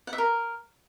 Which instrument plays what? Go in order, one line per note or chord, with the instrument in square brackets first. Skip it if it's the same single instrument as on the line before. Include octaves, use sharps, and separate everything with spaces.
[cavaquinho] F#5
E5
A#4